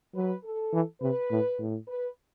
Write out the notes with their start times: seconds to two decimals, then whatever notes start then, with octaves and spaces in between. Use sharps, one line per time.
0.15 F#3 B4
0.44 A4
0.73 E3
1.01 C3 B4
1.31 A2
1.59 A2
1.88 B4